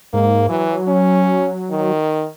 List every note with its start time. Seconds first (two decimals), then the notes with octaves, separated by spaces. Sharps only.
0.13 G#2 A#3
0.49 E3 F#3
0.88 C#4
1.71 D#3